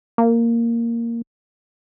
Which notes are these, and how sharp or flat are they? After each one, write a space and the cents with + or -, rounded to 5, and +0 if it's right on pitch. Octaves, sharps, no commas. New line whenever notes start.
A#3 -5